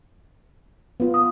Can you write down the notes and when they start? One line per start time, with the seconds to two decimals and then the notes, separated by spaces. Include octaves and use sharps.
1.00 B3 F4
1.14 D#6